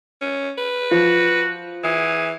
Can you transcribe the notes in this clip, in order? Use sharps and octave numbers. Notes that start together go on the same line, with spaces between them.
C#4
B4
F3 F#4
E3 G#4